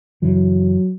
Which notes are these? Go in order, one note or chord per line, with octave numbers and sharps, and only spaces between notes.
F#2 C#3 E3 F#3